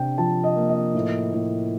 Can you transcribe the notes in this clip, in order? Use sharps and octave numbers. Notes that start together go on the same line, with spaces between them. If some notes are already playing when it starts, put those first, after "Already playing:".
Already playing: C3 D4 G5
F3 A5
D#5
A#3
D#5
A2
A2